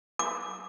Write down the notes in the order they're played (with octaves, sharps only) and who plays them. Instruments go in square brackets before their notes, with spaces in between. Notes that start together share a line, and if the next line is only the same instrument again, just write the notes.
[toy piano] D6